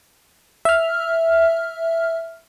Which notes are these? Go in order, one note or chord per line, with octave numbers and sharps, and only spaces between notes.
E5 F6